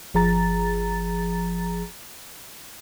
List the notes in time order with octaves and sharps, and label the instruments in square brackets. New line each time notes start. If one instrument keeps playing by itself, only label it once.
[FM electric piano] G1 F3 G#4 A#5 A6